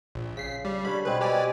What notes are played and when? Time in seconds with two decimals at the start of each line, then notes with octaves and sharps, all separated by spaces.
0.15 A#1
0.37 C#3 B6 C7
0.65 G3
0.85 D3 C#5 B5
1.05 B2 C4 G#4 B4
1.21 G4 D5 G#5